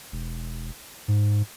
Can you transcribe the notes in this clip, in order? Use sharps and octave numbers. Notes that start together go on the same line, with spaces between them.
E1
G#2